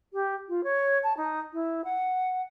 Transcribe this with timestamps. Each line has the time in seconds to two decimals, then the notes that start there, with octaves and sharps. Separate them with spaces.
0.13 G4
0.49 F4
0.64 C#5
1.03 A5
1.17 D#4
1.53 E4
1.84 F#5